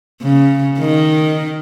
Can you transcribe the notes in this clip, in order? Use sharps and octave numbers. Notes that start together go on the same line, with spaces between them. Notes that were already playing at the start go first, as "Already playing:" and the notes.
C#3
D#3